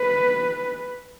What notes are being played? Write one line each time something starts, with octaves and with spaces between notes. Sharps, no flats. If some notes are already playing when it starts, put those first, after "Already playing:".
Already playing: B4